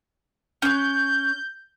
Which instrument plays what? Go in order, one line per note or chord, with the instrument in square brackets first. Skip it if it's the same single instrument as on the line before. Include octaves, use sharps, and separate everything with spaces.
[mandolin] C#4 F#6 [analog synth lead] G6